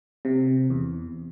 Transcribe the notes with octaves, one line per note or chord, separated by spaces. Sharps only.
C3
E2